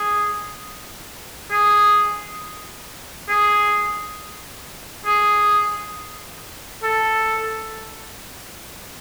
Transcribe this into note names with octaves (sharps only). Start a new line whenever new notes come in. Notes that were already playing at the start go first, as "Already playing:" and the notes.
Already playing: G#4
G#4
G#4
G#4
A4